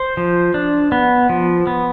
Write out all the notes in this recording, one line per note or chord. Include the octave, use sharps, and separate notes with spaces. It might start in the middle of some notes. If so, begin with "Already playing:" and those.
Already playing: C5
F3
D4
B3
F3
B3